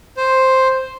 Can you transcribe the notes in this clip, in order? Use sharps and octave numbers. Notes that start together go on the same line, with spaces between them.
C5